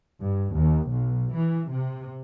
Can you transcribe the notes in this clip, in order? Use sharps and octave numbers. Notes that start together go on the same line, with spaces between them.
G2
D#2
B1
E3
C3